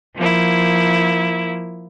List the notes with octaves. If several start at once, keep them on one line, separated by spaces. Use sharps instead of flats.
F3 A#3 E4